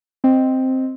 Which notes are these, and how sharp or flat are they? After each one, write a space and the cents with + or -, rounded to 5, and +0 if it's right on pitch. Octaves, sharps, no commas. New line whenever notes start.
C4 +0 D#5 +0